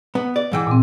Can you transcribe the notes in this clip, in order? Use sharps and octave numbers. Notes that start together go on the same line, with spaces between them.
B3
D5
G#2 E3 G5
A#2 C4